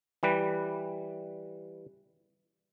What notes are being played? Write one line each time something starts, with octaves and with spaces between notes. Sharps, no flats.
E3 G3 B4